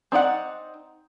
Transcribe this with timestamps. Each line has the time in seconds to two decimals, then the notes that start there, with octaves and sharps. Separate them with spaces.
0.12 C4 D#4 D5 F#5